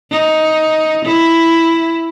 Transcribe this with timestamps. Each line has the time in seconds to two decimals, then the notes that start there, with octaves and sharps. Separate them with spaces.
0.11 D#4
1.05 E4